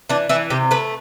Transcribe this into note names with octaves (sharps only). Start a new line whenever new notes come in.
E3 D4
E3 E4
C3 G4
A3 B4